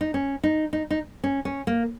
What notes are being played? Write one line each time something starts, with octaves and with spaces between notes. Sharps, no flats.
D#4
C#4
D#4
D#4
D#4
C#4
C#4
A#3